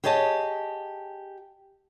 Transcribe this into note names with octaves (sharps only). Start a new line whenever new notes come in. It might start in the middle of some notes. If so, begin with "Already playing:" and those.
G4 G#4 C#5 D#5 A5